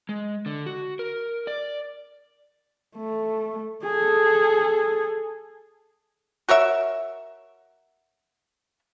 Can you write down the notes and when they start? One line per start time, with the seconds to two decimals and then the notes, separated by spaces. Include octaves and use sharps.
0.09 G#3
0.46 D3
0.66 F#4
0.99 A#4
1.47 D5
2.96 A3
3.84 G#4 A4
6.49 F#4 A#4 C#5 E5